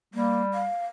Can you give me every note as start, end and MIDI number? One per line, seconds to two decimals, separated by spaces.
0.14 0.68 55
0.14 0.41 58
0.54 0.86 77